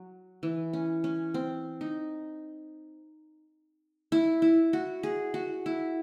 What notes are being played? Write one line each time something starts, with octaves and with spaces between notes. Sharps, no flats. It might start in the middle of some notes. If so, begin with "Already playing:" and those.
Already playing: F#3
E3
C#4
C#4
C4
D#4
E4
E4
F#4
G#4
F#4
E4